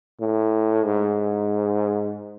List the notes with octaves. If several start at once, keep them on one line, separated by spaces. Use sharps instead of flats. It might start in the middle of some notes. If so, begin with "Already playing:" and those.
A2
G#2